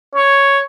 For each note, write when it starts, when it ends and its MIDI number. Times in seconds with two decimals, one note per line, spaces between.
0.15 0.59 73